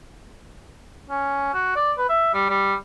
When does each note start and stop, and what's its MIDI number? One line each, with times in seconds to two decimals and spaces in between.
1.10 1.54 61
1.54 1.74 66
1.76 1.92 74
1.98 2.06 71
2.09 2.30 76
2.34 2.45 55
2.49 2.74 55